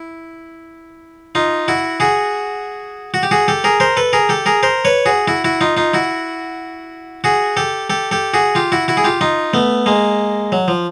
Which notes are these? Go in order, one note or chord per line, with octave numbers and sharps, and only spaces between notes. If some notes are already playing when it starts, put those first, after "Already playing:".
Already playing: E4
D#4 F4
E4 F#4
F#4 G#4
F#4
G4
F#4 G#4
G4 A4
G#4 A#4
A#4 C5
A4 B4
G#4 A#4
G4 A4
G#4 A#4
A#4 C5
B4 C#5
F#4 G#4
E4 F#4
E4 F#4
D#4 F4
D#4 F4
E4 F#4
F#4 G#4
G4 A4
G4 A4
G4 A4
F#4 G#4
F4 G4
E4 F#4
E4 F#4
G#4
F4 G4
D#4 F4
A3 B3
G#3 A#3
F#3
F3